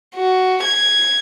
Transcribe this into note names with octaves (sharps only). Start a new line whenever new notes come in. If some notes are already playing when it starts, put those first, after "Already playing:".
F#4
G#6